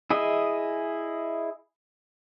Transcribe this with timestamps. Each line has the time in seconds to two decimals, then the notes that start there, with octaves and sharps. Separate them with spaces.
0.10 E4 G#4 D#5 E5